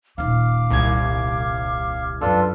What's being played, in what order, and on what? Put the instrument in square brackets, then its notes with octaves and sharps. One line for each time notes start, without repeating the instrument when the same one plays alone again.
[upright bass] D#1 D#4 [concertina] F5 [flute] D6
[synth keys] C2 G#6
[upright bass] F#2 F#3 [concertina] D4 F4 A4 [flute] B4